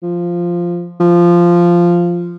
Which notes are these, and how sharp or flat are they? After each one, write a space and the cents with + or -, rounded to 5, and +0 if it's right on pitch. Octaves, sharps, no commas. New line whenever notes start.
F3 -5
F3 -10